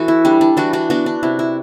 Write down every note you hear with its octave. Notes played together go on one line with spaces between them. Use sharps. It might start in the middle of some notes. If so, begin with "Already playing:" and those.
Already playing: E3 B3 F#4 A4 E5
E4
G3 D4
D4
E3 D4 F#4
D4 F#4
B3 D4 F#4
D4
C3 E4
E4